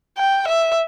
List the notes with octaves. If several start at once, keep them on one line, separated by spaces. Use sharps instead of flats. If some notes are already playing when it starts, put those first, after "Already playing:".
G5
E5